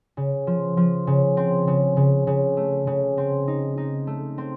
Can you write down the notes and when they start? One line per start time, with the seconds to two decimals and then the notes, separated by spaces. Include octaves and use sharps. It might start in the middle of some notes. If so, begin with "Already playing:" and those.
0.17 C#3
0.47 F3
0.77 F3
1.07 C#3
1.37 C4
1.67 C#3
1.97 C#3
2.27 C#3
2.57 A3
2.87 C#3
3.18 C4
3.48 D#4
3.78 D#4
4.07 A3
4.38 C4